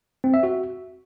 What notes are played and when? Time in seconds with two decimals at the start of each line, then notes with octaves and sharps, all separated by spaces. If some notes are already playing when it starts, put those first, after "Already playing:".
0.24 C4
0.34 E5
0.43 F#4